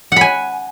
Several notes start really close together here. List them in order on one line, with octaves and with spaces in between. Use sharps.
F#5 B5 G#5